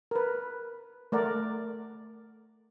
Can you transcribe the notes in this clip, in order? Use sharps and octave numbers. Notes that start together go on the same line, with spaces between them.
A#4 B4
A3 A#4 D5 F#5